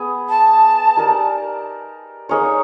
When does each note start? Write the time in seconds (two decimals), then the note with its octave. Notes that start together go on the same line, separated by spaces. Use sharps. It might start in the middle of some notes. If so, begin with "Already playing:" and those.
Already playing: B3 G#4
0.29 A5
0.96 D#4 G4 A#4 D5
2.29 A#3 D#4 G#4 C#5